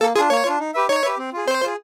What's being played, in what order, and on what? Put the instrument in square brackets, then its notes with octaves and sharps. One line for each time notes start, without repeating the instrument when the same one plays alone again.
[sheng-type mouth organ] A#3 [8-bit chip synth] A4
[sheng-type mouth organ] D4 F4 [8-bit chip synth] G#4
[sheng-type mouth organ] A#3 [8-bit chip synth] C#5
[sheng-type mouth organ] D4 F4
D#4
G4 B4 E5
[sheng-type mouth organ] D#4 [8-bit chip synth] C#5
[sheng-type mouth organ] G4 B4 E5
C4
F4 G#4
[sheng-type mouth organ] C4 [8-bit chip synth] C5
[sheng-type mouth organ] F4 G#4